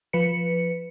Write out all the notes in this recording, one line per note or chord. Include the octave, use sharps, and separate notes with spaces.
F3 B4 C#7